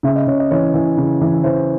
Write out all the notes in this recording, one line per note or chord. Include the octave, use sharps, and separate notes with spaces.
C#3 E5
D#5
C#3 C#5
D#5
E3 C#5
E3
C#3
E3
E3 C5